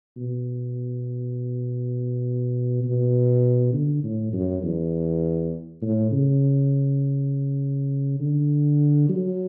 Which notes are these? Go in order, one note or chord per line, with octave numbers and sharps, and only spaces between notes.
B2
B2
D3
A2
F#2
E2
A2
C#3
D3
F#3